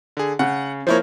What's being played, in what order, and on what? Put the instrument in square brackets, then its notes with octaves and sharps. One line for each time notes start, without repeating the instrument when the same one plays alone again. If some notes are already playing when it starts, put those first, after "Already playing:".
[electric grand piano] D3 G#4
[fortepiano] C#3 [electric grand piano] F#5
[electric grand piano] F3 E4 C#5 [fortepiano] A#3 C5